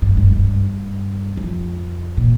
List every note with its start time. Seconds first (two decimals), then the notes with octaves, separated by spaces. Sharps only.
0.02 G2
0.17 G2
0.32 G2
1.37 F2
2.17 A#2